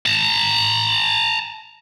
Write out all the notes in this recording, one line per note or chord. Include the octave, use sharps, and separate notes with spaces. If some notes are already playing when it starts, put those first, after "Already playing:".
A5 A#5